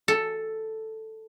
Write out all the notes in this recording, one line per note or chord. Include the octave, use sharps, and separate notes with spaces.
A4